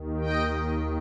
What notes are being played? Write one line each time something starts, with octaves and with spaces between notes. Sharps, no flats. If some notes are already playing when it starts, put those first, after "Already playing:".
Already playing: D#2 D#3
D#5 G5